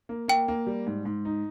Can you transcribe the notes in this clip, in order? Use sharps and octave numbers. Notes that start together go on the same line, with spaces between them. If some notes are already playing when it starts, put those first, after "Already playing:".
A#3
A#3 G5
A#3
G3
G#2
G#2
D#4